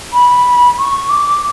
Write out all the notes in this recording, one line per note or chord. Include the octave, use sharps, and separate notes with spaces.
B5
C#6
D6